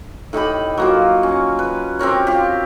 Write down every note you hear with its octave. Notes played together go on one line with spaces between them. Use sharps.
A2 D#4 G4 B5
F#3 A#3 F4
C#4
B4
C4 G4 A#4 C#5
F4 G4